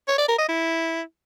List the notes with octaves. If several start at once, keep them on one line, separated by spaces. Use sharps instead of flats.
C#5
D5
A#4
D#5
E4